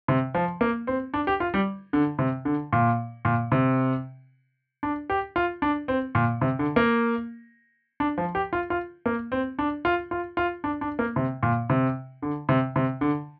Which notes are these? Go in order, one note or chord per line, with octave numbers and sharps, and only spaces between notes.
C3
F3
A#3
C4
D4
G4
F4
G3
D3
C3
D3
A#2
A#2
C3
D4
G4
F4
D4
C4
A#2
C3
D3
A#3
D4
F3
G4
F4
F4
A#3
C4
D4
F4
F4
F4
D4
D4
A#3
C3
A#2
C3
D3
C3
C3
D3